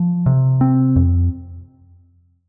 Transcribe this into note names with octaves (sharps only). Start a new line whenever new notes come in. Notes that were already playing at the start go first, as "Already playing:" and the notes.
Already playing: F3
C3
C4
F2